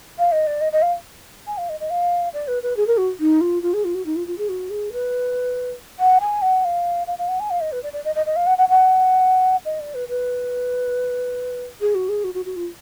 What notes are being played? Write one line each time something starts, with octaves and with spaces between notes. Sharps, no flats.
F5
D#5
D5
D#5
D#5
F5
G#5
F5
D#5
D#5
F5
D5
B4
B4
G#4
A#4
F#4
D#4
F4
F4
G#4
F4
F#4
D#4
F4
F4
G#4
F#4
G#4
B4
F#5
G#5
F#5
F5
F5
F5
F#5
G#5
F5
D#5
B4
D5
D5
D#5
D#5
D#5
F5
F#5
F#5
F#5
D#5
D5
B4
B4
G#4
F#4
G#4
F#4
F#4
F#4
F4